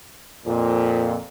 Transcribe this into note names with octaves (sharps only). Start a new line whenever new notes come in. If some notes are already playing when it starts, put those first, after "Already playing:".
F2 A#2